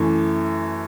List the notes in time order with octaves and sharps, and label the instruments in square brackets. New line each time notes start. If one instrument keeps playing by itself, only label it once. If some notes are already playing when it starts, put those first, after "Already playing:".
Already playing: [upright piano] F#2 E3 A3